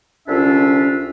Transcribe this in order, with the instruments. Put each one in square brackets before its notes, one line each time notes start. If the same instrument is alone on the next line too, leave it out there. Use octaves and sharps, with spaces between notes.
[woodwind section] C2 D3 C#4 D4 F4 E5